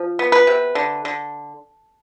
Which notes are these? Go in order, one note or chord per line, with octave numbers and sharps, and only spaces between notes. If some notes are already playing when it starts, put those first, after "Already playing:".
Already playing: F3
B3
B4
C3
D3
D3